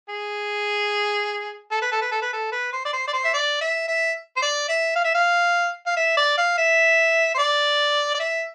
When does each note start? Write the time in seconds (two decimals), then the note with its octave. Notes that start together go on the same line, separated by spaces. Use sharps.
0.09 G#4
1.72 A4
1.82 B4
1.92 A4
2.01 B4
2.12 A4
2.22 B4
2.33 A4
2.52 B4
2.73 C5
2.85 D5
2.93 C5
3.08 D5
3.13 C5
3.24 E5
3.34 D5
3.61 E5
3.88 E5
4.36 C5
4.42 D5
4.68 E5
4.96 F5
5.04 E5
5.14 F5
5.86 F5
5.97 E5
6.17 D5
6.37 F5
6.58 E5
7.34 C5
7.38 D5
8.14 D5
8.20 E5